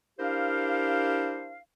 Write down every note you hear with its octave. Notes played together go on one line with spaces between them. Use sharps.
D4 E4 G4 A#4 C5 F5